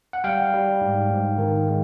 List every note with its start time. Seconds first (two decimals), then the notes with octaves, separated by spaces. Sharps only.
0.13 F#5
0.24 G3 F5 G5
0.54 G3
0.81 G#2
1.10 G#2
1.38 D#3
1.67 G#3